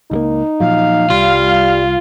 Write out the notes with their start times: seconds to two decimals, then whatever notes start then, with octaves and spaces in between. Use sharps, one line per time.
0.11 C#2 G3 A#3 D#4
0.60 A#2 F3 F#3 F5
1.10 C2 G3 F4